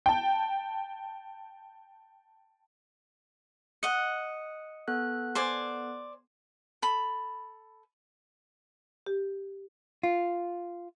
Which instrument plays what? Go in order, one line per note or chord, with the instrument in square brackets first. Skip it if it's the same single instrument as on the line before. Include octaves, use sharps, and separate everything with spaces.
[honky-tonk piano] G5 A5
[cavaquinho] D#5 F#5 [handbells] C#7
[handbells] B3 A4 F#6
[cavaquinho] C5 D5 G#5
A4 B5
[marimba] G4
[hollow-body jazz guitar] F4